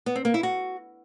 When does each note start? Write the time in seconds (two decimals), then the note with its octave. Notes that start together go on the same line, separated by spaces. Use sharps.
0.06 B3
0.16 C4
0.25 A#3
0.34 E4
0.43 F#4